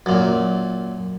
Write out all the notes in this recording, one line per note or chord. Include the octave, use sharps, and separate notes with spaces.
F#2 A#2